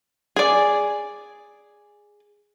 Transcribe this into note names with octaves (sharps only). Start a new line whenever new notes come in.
G#4 D5